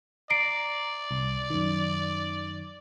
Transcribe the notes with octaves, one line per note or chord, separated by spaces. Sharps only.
D5 A#5 C7 D7
C2
F#2 D#3